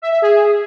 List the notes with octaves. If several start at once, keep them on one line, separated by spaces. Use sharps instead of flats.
E5
E5
G#4